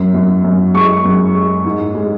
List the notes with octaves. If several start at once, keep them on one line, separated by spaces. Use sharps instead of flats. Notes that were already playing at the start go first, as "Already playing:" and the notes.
Already playing: F#2
F#2
F#2
G#3 C#6
F#2
G#3
G#2
G#3